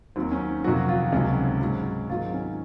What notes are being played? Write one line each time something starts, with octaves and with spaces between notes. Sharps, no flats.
D#2 D#3 F#3 C4
C#4
F2 C3 D#3 F#3 F#4
F4
C#2 C3 D#3 F#3 C#4
G#2 F#3
G#2 D#3 F#3 F4
C#4